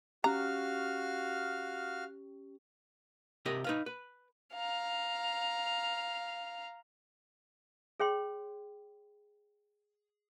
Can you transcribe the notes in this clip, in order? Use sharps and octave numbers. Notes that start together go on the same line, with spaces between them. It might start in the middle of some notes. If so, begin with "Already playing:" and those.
C#4 F#4 G4 F5 A#5 F6
C3 G4 A#4 D#5
D#4 B4 F5
B4
F5 A#5
G#4 C#5 G5 C6